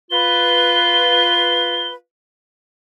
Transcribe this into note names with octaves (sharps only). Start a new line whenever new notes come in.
F4 B4 G7